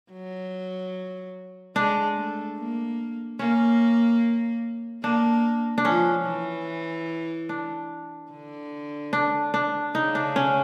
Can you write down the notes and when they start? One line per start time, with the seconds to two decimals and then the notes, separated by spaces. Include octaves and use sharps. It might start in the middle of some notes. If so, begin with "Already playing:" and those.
0.12 F#3
1.76 G#3 D4
2.17 A3
2.58 A#3
3.39 A#3 C#4
5.03 A#3 D4
5.78 D4
5.85 F3 C#4
6.25 E3
7.49 D4
8.31 D3
9.13 D4
9.54 D4
9.95 C#3 D#4
10.15 D4
10.36 C#4